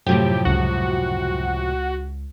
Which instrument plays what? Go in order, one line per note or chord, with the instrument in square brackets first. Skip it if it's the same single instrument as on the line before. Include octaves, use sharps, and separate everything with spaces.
[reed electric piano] F#2 F#3 [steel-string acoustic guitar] A2 C3 F3 [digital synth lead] G4
[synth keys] C#2 [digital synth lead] F#4